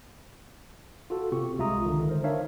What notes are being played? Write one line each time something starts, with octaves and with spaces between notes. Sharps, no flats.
F4 F#4 A4
C3 C4 G4 C#6
C2 G#3 F4 E5 A#5 D#6
D3 D#3
A#4 C5
D4 D#4 C5 C#5 E5 F5